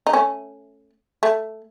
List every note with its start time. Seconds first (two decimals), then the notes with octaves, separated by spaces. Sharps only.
0.07 D#4
0.13 A3 C#4
1.23 A3